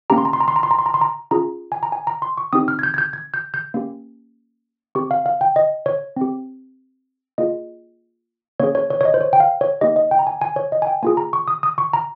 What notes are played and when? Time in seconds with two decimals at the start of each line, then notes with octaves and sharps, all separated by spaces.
0.10 A#3 C#4 G4 A#5
0.18 C6
0.25 A#5
0.33 C6
0.40 A#5
0.48 C6
0.56 A#5
0.63 C6
0.71 A#5
0.79 C6
0.86 A#5
0.94 C6
1.01 A#5
1.31 C#4 F4 G#4 A#5
1.72 G#5
1.83 A#5
1.92 G#5
2.07 A#5
2.22 C6
2.37 C#6
2.53 C4 D#4 G4 D#6
2.68 F6
2.79 G#6
2.83 G6
2.94 G#6
2.98 G6
3.13 G#6
3.34 G6
3.54 G6
3.74 A#3 C#4 G4
4.95 C4 G4 C#6
5.11 F5
5.26 F5
5.41 G5
5.56 D#5
5.86 C#5
6.17 C4 G4
7.38 A#3 F4 G#4 D#5
8.60 A#3 C#4 G#4 C#5
8.75 C#5
8.90 C#5
9.01 C#5
9.05 D#5
9.14 C5
9.21 C#5
9.33 G5
9.40 F5
9.61 C#5
9.81 A#3 D#4 G4 D#5
9.96 D#5
10.11 G5
10.19 A#5
10.27 G#5
10.41 G#5
10.56 C#5
10.72 D#5
10.82 G#5
10.87 G5
11.03 A#3 F4 G#4 G#5
11.17 A#5
11.33 C#6
11.48 D#6
11.63 D#6
11.78 C#6
11.93 A#5